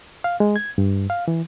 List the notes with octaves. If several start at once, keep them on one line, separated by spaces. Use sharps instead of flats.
F5
G#3
G#6
G2
F5
E3